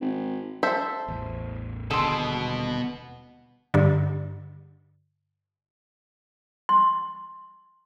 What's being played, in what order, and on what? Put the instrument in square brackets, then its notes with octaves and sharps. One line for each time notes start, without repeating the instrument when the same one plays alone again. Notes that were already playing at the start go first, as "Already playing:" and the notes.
[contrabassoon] G#1
[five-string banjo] A4 C5 E5
[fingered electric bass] A1 E2
[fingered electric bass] D#1 D3 [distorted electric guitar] B2 [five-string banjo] G#4 [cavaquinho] A4 C6
[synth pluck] G2 D3
[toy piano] C6